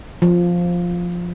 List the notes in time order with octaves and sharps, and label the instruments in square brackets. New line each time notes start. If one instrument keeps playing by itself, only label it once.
[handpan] F3